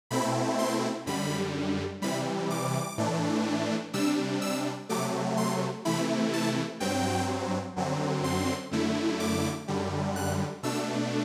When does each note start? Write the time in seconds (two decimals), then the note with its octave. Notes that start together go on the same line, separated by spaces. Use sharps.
0.11 B2 A3 C4 E4 B5
0.59 C6
1.06 F#2 D3 G3 B5
2.02 C3 E3 G3 B5
2.50 D6
2.98 A2 E3 A3 D4
3.93 C3 G3 D4 E6
4.41 E6
4.89 C3 F#3 A3 D6
5.37 C6
5.85 C3 E3 A3 E4 B5
6.33 A5
6.80 G2 F#3 C4 G5
7.76 F#2 D3 F#3 C4
8.24 C6
8.71 F#2 D3 A3 E4
9.20 D6
9.68 F#2 D3 G3
10.16 F#6
10.63 B2 A3 D4 E6